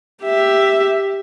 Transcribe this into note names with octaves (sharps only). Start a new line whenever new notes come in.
G4 E5